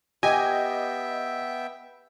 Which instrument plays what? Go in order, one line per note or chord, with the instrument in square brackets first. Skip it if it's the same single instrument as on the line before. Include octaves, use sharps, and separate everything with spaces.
[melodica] B3 E5 G5 [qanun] G4 [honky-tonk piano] D#5 [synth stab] G#5